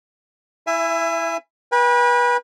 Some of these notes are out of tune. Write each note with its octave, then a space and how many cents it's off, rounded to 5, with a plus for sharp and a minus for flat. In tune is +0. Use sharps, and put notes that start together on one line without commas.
E4 +0 E5 +25 G#5 -10
B4 -30 G5 +45